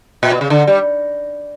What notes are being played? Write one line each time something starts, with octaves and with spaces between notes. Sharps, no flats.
A#2
B2
C#3
D3
G3